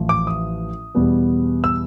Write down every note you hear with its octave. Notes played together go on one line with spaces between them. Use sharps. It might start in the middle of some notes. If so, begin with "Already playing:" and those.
Already playing: A1 A2 F3
D6
D#6
E2 B2 G3 B3
E6